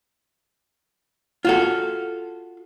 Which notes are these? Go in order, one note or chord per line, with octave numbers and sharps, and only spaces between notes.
F4 F#4 A4